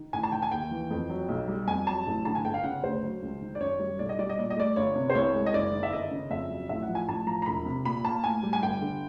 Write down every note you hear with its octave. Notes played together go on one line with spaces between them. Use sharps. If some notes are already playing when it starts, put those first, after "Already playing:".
Already playing: D#3
A1 G#5
A5
D#3 G5
G#5
D#2 G5
E3
F2
F#3
B1
G3
F2 G#5
F#3 A5
A1
D3 A5
G#5
G1 G5
F5
C#3 F#5
D2 C5
F#3
C#2
D#3
D5
F#2 C#5
G3
B1 D5
D#5
G3 D5
D#5
A#2 D5
D#5
A3 D5
G1 C#5
C3
C5
C2 C#5
G#3
D#5
F#1 D5
D#3
E5
G1 D#5
C#3
F2 E5
F#3
A1 E5
F#5
F3
G#5
A1 A5
F3 A#5
A#5
E1 B5
C3
A#2 B5
A#3 A5
A2 G#5
G3
G#5
G1 G5
D3